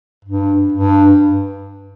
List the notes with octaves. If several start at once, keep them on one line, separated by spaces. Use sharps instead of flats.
G2
G2